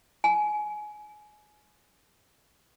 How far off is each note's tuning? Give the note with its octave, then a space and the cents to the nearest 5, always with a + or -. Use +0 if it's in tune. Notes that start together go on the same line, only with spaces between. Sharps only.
G#5 +20